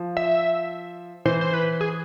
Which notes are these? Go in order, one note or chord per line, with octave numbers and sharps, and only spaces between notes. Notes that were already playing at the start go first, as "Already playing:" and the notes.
Already playing: F3
E5
E3 C5
C5
B4
G#4